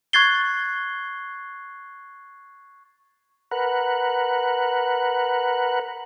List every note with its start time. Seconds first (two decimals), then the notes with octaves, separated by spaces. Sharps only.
0.13 C#6 F#6 G#6 A6 C7 G7
3.51 A#4 B4 F#5